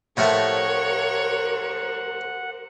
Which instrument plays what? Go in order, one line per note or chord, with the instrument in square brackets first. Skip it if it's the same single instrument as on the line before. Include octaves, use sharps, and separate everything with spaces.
[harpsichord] A2 F3 A3 [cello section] G4 A#4 C5 [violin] C#5 [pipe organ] F#5